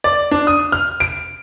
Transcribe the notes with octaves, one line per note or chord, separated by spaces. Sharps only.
D5
D4
D#6
F6
D7